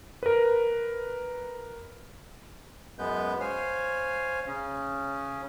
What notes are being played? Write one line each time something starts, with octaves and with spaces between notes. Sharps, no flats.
A#4 B4
F#2 G#3 B3 B4 G6
C5 C#5 F5 G#5
C#3 C#4